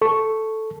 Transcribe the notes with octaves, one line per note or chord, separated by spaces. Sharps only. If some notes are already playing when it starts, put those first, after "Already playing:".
A4 C#6